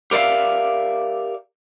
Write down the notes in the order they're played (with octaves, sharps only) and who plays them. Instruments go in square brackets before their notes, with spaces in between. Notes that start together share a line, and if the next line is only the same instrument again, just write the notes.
[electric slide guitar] G4 A#4 D5 E5 F5